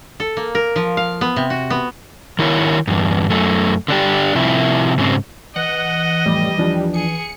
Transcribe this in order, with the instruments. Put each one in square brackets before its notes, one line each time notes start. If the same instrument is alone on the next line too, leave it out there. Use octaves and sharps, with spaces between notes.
[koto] A4
A#3
A#4
F3
F5
B3
C3
F#4
B3
[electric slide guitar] D#3 E4 A#4 C#5
E2 G2
F#2 A3
D3 D4 G4
C3 F3 E4
G#2 C#3 C4
[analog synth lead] E3 [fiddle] D#5 [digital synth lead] F#5
[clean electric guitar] F2 A2 [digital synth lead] G3
[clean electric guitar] E2 F3 D4
[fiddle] G#4 [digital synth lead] C#7